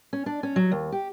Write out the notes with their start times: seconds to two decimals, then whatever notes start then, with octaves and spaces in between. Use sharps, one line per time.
0.13 C#4
0.26 D4
0.43 C#4
0.56 F#3
0.71 D#2
0.92 G4